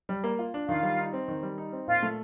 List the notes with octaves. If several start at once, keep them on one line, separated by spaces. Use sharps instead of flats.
G3
A#3
F4
D4
D#3 F4 F5
G3
D#4
C4
D#3
G3
D#4
C4
A#2 F4 F5
A3